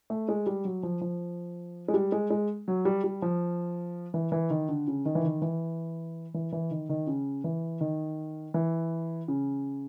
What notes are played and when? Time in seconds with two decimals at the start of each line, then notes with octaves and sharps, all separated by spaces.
0.10 A3
0.29 G#3
0.46 G3
0.65 F#3
0.83 F3
1.01 F3
1.88 G#3
1.94 G3
2.12 G#3
2.30 G#3
2.68 F#3
2.85 G3
3.04 G3
3.22 F3
4.14 E3
4.32 E3
4.50 D#3
4.69 D3
4.87 C#3
5.05 D#3
5.15 E3
5.25 D#3
5.42 E3
6.34 E3
6.52 E3
6.71 D#3
6.89 D#3
7.07 C#3
7.44 E3
7.81 D#3
8.54 E3
9.28 C#3